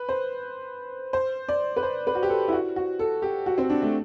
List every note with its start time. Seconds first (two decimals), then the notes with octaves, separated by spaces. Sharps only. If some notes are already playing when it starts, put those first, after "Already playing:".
Already playing: B4
0.09 C5
1.13 C5
1.49 D5
1.76 B4
1.83 C5
2.07 B4
2.15 F#4
2.23 G4
2.29 A4
2.48 E4
2.53 F#4
2.76 F#4
2.99 A4
3.22 G4
3.46 F#4
3.58 C4
3.70 D4
3.82 A3